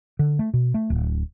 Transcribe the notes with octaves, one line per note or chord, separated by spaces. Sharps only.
D3
A3
B2
A3
D1